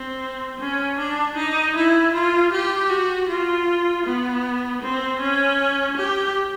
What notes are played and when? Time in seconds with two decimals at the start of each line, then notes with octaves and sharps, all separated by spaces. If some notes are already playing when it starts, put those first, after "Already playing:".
Already playing: C4
0.60 C#4
0.98 D4
1.37 D#4
1.75 E4
2.14 F4
2.52 G4
2.90 F#4
3.29 F4
4.06 B3
4.82 C4
5.20 C#4
5.97 G4